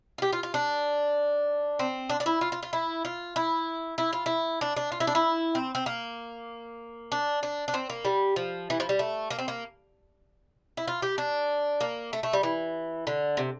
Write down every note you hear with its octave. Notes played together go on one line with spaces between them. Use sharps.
F4
G4
F4
F4
D4
C4
D4
D4
E4
F4
F4
F4
E4
F4
E4
E4
F4
E4
D4
D4
F4
E4
D4
E4
C4
C4
A#3
D4
D4
D4
C4
A#3
G3
F3
E3
F3
G3
A3
A#3
C4
A#3
E4
F4
G4
D4
A#3
A3
A3
G3
E3
D3
C3